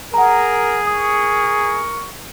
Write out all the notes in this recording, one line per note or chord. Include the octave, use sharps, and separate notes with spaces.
G#4 A#4 F#5 A#5
A#4 C#6 D#6